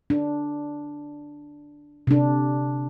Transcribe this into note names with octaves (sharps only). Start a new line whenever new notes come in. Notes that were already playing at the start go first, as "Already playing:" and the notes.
D4
C3 D4